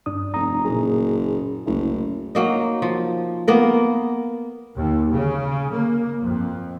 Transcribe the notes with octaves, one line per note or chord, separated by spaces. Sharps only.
G2 D4 D#6
F1 A#5 D#6
F#1 A#2 A#3 G#4
F#1 C2 A3 E4
F#3 A#3 D#4
F3
A#3 B3 A#4
D#2
C#3
A#3
F2